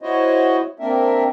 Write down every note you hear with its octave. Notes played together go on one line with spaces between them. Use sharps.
E4 F#4 C5 C#5 D#5
A#3 C4 D4 A#4 E5